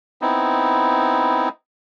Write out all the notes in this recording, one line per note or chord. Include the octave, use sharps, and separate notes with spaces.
B3 C4 D#4 E4